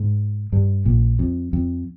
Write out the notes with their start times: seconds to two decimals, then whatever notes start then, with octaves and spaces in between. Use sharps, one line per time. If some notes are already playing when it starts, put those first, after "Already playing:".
Already playing: G#2 G#3
0.52 G2 G3
0.85 A#1 A#2
1.19 F2
1.53 F2